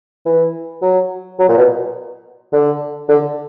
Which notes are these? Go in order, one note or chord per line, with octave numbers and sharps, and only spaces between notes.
E3
F#3
F#3
A#2
B2
D3
D3